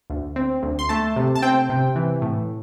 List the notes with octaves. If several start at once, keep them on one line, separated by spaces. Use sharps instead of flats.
D2
C4
D2
C6
A3 A5
C3
A5
C4 G5
C3
E3
A2